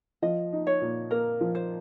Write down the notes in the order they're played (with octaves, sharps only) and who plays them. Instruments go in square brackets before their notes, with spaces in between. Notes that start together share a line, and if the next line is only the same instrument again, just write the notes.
[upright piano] F3 [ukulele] D#5
[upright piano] D#4
[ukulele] C#5
[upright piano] A#2
[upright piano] A#3 [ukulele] A#4
[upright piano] F3
[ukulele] C5